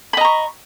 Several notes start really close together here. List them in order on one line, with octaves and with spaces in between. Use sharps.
B5 D#5 A#5 C#6